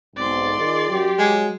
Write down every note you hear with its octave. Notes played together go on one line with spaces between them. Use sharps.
B1 G#2 C4 D5 C6
D#3 F4 G#4
F#2 F#3 G4
F#3 G#3